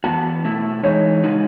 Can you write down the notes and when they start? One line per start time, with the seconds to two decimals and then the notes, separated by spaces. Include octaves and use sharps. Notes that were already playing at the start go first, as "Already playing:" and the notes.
0.04 E3 B3 F#4 A5
0.44 B2 A3 E4
0.83 E3 G#3 D#4 C#5
1.24 C#3 G#3 D#4 F#4